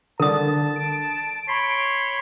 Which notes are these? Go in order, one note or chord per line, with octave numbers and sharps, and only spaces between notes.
D3 A#4 A5 D#6
D7
C#5 B5 C6